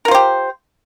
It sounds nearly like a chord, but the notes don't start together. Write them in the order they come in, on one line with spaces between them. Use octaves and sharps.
A#4 F4 C5 G4